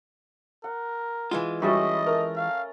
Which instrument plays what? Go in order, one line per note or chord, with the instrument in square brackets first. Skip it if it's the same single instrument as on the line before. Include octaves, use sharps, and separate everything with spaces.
[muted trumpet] A#4 [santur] F#5
[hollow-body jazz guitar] E3 G#3 F4
[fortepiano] G3 F#4 [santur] A3 C#4 A4 [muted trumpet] D#5
[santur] A3 [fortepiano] A#4
[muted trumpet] F5